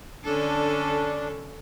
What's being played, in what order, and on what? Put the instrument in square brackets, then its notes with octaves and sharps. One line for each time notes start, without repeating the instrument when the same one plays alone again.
[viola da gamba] D3 C#4 A4 [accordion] D4